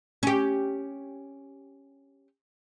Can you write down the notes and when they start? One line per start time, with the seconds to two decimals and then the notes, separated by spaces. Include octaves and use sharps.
0.23 C#4 G4